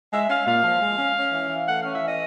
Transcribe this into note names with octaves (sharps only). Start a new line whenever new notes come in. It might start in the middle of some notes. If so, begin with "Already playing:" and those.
G#3 E5
C#4 F5
A#2 F5
F3
G#3
C#4
C#4
E3
E3
A3 F#5
C#4 F5
E5
E3 D#5